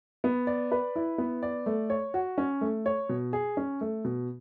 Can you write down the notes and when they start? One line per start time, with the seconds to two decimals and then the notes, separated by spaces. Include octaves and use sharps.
0.24 B3
0.47 D5
0.72 B4
0.96 E4
1.18 B3
1.43 D5
1.66 A3
1.90 C#5
2.14 F#4
2.38 C#4
2.61 A3
2.86 C#5
3.09 B2
3.33 G#4
3.57 C#4
3.81 A3
4.05 B2